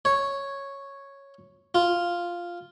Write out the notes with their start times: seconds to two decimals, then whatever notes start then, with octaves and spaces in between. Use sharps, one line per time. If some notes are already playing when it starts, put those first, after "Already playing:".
0.05 C#5
1.75 F4